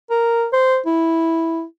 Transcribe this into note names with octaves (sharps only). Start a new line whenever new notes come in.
A#4
C5
E4